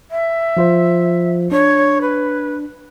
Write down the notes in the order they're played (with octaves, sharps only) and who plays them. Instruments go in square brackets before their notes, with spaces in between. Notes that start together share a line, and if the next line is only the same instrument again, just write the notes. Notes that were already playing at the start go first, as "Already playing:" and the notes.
[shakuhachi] E5
[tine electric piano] F3 F4 C5
[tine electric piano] D4 [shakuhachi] C#5
[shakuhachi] B4